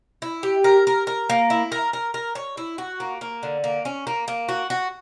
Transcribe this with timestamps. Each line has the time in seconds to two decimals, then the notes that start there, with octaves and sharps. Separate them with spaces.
0.22 E4
0.43 G4
0.64 A#4
0.87 A#4
1.07 A#4
1.30 A#3
1.50 E4
1.72 A#4
1.93 A#4
2.14 A#4
2.35 C#5
2.57 E4
2.78 F#4
3.00 A#3
3.21 A#3
3.43 D3
3.64 A#3
3.85 C#4
4.07 A#3
4.28 A#3
4.49 F#4
4.70 F#4